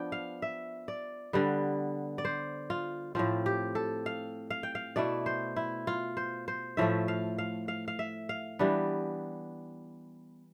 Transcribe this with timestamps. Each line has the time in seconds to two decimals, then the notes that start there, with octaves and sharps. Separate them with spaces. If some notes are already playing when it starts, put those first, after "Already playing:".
Already playing: F3 B3 D4 G5
0.12 F5
0.42 E5
0.88 D5
1.33 D3 G3 B3
2.18 D5
2.25 C5
2.70 F4
3.15 A2 F3 C4 F4
3.46 G4
3.75 A4
4.06 F5
4.50 F5
4.63 G5
4.75 F5
4.96 B2 A3 E4 D5
5.26 C5
5.56 E4
5.87 F4
6.17 C5
6.48 C5
6.77 A2 F3 A3 E5
7.08 F5
7.38 F5
7.68 F5
7.88 F5
7.99 E5
8.29 F5
8.59 E3 G3 B3 D4